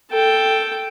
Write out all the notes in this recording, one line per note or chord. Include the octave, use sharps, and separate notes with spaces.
A4 G5